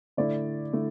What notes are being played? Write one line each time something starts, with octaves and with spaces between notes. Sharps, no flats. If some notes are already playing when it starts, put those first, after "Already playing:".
D3 A3 E4 D5
D3 A3 E4